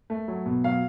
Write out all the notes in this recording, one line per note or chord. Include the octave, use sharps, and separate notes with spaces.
A3
F#3
B2
F#3 F5